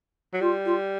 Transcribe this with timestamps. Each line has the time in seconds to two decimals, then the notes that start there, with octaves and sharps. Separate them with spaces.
0.33 F#3
0.40 G3 F4
0.65 F4